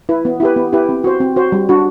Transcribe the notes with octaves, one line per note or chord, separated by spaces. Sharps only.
E4 B4
B3
E4 G4 B4
B3
E4 G4 B4
C4
F#4 C5
C4
F#4 C5
G3
D4 F#4